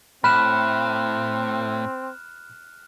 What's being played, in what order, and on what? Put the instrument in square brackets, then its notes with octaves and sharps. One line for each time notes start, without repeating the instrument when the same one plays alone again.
[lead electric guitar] A2 [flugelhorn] C4 [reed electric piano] B5 [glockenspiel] F6 F#6 E7